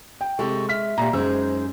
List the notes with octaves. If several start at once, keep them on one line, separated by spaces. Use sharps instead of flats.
G5
C3 G#3 G4 A4 C#6
E5 F6 B6
A#2 G4 A#5
F#2 G#3 D#4 G#4 C5 E6